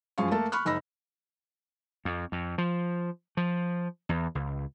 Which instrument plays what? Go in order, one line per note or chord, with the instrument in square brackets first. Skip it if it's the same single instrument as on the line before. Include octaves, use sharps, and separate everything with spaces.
[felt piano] F#2 F3 G#4 F5 C#6
A3 A#3 A4
B5 C#6 F6 F#6
F#1 D#4 B5 E6 A#6
[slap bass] F2
F2
F3
F3
E2
C#2